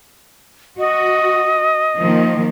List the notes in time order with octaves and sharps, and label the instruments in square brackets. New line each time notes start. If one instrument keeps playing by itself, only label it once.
[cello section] F#4 [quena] D#5
[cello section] D#3 F3 A#3